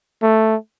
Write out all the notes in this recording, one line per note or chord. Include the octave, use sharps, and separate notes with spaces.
A3